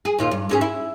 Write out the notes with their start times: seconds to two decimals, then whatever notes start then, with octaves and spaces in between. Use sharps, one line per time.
0.05 G#4
0.18 D#2 A#2 F4
0.31 G2
0.49 G#2 C#4 G#4
0.61 E4